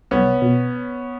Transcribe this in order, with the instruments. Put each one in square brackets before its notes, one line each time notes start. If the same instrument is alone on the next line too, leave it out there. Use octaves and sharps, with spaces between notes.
[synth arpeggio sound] C2 [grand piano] B3 C#4
[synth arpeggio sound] B2